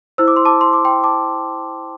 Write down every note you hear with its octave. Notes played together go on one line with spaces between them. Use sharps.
E4 C5 E6
D6
C6
A5 D6
C6
D6
G5 C6
A5 D6